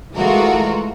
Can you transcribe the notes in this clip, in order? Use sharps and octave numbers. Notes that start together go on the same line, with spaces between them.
E3 G#3 A3 F4 F#4 A#4